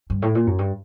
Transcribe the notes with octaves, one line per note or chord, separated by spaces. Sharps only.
G2
A2
A#2
F#2
G2